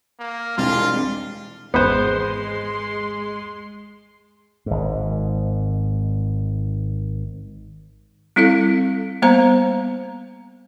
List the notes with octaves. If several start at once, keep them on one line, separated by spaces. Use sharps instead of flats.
A#3
E1 C2 G3 G#3 C4 D4 F4 A6
G#1 E2 G#3 B3 B4 C5 C6
G#1 G#2
G3 C4 E4 A4 F5
G3 A#3 B3 C5 F5 A#5